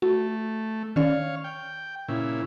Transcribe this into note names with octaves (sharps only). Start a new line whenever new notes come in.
A3 F#4
D#3 C#4 C#5 D5 F5
G5
A#2 C#3 E4